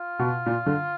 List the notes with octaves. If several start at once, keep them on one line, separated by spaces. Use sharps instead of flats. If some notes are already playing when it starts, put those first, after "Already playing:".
Already playing: F4
B2
A#2
D3